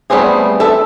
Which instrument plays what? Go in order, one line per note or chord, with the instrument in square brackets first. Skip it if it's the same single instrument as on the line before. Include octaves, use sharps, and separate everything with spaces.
[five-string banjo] G3 A3 B3 C4 G#4
A4 E5